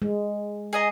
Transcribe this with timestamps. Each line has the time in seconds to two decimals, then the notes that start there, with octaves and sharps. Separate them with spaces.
0.02 G#3
0.73 G#4 D#5 A#5